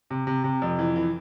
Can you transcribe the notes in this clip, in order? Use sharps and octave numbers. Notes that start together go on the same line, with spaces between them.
C3
C3
C3
F2
E3
E3